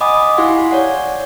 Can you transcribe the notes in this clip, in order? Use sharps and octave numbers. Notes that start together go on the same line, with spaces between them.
D#5 F#5 G#5 B5 D6 D#6
E4 G4 F5 F#5 G#5 C6
C#5 D5 F#5